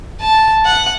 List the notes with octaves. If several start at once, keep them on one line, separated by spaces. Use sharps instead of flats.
A5
F#5